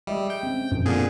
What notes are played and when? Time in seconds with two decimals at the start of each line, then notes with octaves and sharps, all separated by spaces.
0.07 G3 G#3 D#5 E5
0.30 G5
0.43 C4 C#4
0.72 F#2 B2 F3
0.86 A#2 D3 C4 G#4